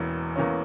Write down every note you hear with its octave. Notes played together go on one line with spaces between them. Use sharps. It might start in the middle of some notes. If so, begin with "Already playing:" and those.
Already playing: E1 E2 E3 A#3 C#4
E2 E3 A#3 C#4